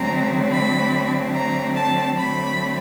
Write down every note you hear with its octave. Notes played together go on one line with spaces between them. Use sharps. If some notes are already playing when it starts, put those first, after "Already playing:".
Already playing: D3 F#3 A3 C4 A#5
B5
A#5
A5
D3 F#3 A3 C4 B5